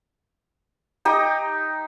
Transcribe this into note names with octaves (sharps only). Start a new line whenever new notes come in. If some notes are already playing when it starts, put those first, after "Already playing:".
D#4 G4 A#5 D#6